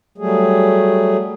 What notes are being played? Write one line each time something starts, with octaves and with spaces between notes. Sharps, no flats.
F#3 G3 A3 G#4